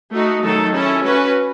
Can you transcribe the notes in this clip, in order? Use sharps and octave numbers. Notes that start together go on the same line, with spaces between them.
A3 D#4 F#4
D#3 F#3 A3 D#4 A4
C#4 E4 A4
C#4 F#4 B4